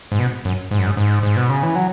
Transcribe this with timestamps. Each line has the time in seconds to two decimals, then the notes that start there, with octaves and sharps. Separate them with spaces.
0.12 G#2
0.19 B2
0.45 F#2
0.71 G#2
0.79 F#2
0.86 G#2
0.97 G#2
1.23 G#2
1.36 B2
1.49 C#3
1.63 E3
1.76 F#3